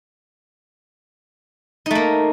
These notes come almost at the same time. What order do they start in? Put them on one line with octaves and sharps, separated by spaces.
D#4 A3 A#3